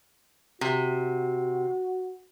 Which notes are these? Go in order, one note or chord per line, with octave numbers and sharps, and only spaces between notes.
C3 F#4